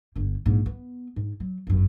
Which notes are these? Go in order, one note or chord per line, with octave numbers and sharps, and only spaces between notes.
G1 D3
A#1 G#2
B3
G#2
F#3
G1 F#2